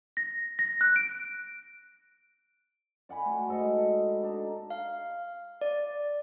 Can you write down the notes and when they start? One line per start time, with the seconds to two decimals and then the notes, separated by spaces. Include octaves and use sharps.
0.17 A#6
0.59 A#6
0.81 F#6
0.96 D7
3.09 D5 F#5 G#5 B5
3.25 A3 F#4
3.48 G#2 A4 D#5
4.23 D4 D#4 A4
4.70 F5
5.61 D5